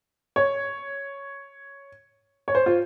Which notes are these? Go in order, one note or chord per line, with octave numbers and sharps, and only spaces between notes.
C#5
C#5
C5
F4